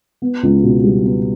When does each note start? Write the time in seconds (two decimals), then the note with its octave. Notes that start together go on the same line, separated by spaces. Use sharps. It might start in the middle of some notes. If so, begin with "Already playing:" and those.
0.22 B3
0.43 C#2
0.63 B2
0.84 G3
1.03 B3